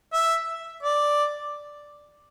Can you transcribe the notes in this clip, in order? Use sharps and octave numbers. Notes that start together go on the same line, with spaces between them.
E5
D5